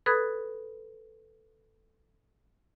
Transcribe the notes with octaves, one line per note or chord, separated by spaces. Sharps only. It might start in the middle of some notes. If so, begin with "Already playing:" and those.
A4 B4 B5 D#6 F#6 G#6